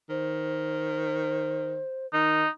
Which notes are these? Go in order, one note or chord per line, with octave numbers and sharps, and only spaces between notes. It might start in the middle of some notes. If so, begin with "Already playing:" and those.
D#3 C5
D#3 D#4